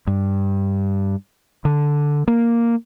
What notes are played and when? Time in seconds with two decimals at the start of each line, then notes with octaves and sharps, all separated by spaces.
0.07 G2
1.65 D3
2.28 A#3